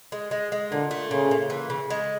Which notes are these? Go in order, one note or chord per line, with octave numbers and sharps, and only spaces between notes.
G#3
G#3
G#3
A#2 D3
A3
A#2 C#3
A#2
E3
C#3
G#3